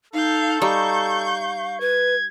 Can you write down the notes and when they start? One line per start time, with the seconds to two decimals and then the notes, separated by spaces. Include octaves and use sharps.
0.13 D#4 A4 F5 G6
0.62 G3 D#4 F5 C#6 G6
1.80 B4 G#6